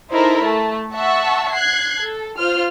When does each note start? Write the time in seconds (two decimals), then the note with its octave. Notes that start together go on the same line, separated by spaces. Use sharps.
0.11 D#4 E4 A4 A#4 C5
0.43 A3 A5
0.93 E5 F#5 A5 C#6 E6
1.52 F#6 G#6 C7
2.01 A4
2.39 F4 C5 F6